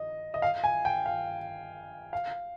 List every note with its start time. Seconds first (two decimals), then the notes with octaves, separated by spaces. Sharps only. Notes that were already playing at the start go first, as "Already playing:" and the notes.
Already playing: D#5
0.34 D#5
0.42 F5
0.64 G#5
0.85 G5
1.06 F5
2.13 F5